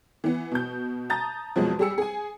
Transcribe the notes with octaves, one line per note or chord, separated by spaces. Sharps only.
E3 B3
B2 G6
A5 A#5 D#6 G6 A6
F2 B2 F3 F#3 G#3
G3 G4 G#4 E6 C#7
G#4 G#5